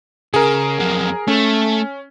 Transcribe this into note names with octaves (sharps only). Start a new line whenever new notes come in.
C#3 G#4 A#4
F2 F#3
A3 C#4